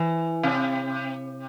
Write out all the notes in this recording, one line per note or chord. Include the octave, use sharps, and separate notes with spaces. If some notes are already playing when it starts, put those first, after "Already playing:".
Already playing: E3
C3